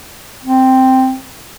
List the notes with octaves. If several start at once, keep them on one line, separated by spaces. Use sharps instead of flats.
C4